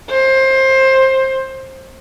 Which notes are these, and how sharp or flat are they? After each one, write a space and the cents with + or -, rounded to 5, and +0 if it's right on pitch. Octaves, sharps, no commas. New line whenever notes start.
C5 +20